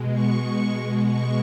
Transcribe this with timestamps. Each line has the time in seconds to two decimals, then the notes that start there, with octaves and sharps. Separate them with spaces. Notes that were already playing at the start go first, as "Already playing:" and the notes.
Already playing: B2 G#3
0.12 C#6
1.05 B2 G#3 C#6